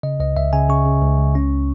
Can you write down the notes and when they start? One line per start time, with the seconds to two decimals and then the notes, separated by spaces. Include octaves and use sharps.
0.03 C#3 D#5
0.20 C#2 D#5
0.36 C#2 E5
0.53 C#3 G#5
0.69 C#3 C#6
0.85 C#3
1.01 C#2
1.18 C#2
1.35 C#4